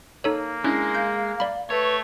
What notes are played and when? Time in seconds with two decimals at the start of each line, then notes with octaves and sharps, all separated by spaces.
0.24 A#3 D#4 A4 C#5
0.64 G#3 C#4 D4 E4
0.95 F5 G6
1.40 D5 B5
1.70 A3 B4 C#5